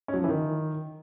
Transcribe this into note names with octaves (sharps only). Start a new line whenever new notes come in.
C#4
F#3
F3
E3
D#3